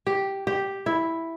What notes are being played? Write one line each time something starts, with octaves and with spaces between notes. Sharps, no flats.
G4
G4
E4